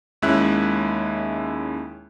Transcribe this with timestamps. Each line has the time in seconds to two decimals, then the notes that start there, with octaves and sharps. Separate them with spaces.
0.22 D#2 G#3 C#4 E4 E5 F#6